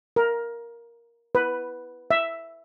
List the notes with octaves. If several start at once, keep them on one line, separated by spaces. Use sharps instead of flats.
A#4
B4
E5